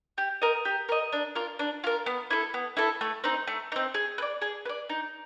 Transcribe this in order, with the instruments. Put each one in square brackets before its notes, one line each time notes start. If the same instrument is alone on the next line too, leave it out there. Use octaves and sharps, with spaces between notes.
[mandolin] G4
A#4 D#5
G4
A#4 D#5
D4
F4 A#4
D4
F4 A#4
B3
E4 A4
B3
E4 A4
A3
C4 D#4
A3
C4 D#4
G#4
B4
D5
G#4
B4
D5
D#4